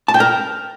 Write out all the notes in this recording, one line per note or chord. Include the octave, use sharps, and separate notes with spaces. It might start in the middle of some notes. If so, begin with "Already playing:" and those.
A5
G5
A#4